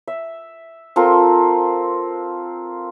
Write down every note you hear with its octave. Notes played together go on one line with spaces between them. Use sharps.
E5
C4 F4 A4 A#4